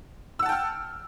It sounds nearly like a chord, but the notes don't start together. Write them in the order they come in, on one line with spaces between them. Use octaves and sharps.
E6 F#5 A5 G5 F6